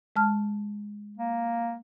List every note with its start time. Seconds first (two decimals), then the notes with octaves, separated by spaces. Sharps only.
0.16 G#3 A5 F6
1.18 A#3